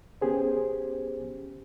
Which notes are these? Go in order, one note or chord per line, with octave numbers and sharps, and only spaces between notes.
B3 C#4 G4 G#4 C5